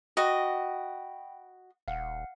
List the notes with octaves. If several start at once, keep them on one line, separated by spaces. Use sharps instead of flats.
F#4 D#5 G5 B5
D#1 F5 F#5